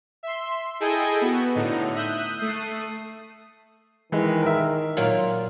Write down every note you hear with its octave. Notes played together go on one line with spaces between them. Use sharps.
E5 C6
E4 G#4 A4 D#5 G5 G#5
B3 F#4
A2 D3 D#4
E5 D#6 F#6 G6
A3 D#6 C7
D#3 E3 G#3
A#4 E5
A#2 F#3 F4